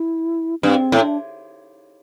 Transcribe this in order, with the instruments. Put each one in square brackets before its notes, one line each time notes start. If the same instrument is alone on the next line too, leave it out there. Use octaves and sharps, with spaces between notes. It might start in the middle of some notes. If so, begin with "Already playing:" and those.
Already playing: [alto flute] E4
[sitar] G2 [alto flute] C4
[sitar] A2
[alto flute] D4